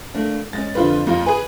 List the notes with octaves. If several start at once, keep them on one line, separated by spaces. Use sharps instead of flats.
A3 A#3 D4
G#3 C#4 A6
F2 D3 F4 B4
F2 A#3 F4
G#4 B4 G#5